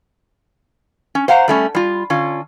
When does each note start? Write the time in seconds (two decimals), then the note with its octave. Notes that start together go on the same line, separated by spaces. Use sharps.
1.15 C#4
1.28 C5 F5 F#5 A#5
1.48 G3 A3 C#4
1.75 G3 F4
2.10 D3 C#4 F4